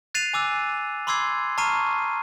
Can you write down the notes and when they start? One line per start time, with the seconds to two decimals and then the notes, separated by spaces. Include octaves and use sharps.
0.14 F#6 A6 C7 D#7 F7
0.33 G#5 D6 E6 F#6
1.07 B5 C6 D6 E6 G#6 C7
1.58 A5 A#5 C#6 F6 C7 D#7